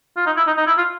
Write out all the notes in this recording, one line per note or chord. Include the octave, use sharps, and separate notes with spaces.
F4
D#4
E4
D#4
D#4
E4
F4